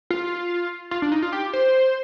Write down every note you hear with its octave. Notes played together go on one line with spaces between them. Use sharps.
F4
F4
D4
D#4
F4
G4
C5